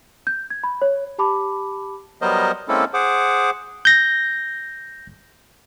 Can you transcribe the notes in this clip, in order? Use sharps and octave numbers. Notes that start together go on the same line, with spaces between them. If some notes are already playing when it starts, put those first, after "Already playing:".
G6
G#6
B5
C#5
G4 A5 B5 D6
F#3 G3 B3 A#4 C5 D#5
G#3 A#3 C4 C#4 E4 A4
G#4 C5 F#5 D6
G6 A#6